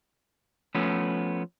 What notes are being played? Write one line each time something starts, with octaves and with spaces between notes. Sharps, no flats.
F3 A3 B3 C#4